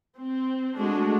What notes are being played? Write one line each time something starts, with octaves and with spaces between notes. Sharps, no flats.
C4
G#3 A3 D4 F#4